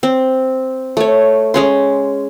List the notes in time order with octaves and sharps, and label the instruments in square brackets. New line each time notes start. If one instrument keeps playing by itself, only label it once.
[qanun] C4
A3 C#5
G#3 C#4 C6